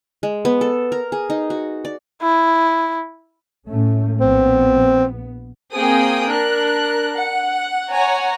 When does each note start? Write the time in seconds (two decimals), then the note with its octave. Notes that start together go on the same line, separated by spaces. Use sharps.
0.23 G#3
0.45 B3
0.61 A4
0.92 A#4
1.12 G#4
1.30 D#4
1.50 F#4
1.85 D5
2.21 E4
3.67 A2 A3 C#4
4.20 A#1 B3 C4
5.74 A#3 C4 G#4 G5 D#6
6.30 D4 A#4 F#6
7.15 F#5
7.91 C#5 F#5 G#5 A#5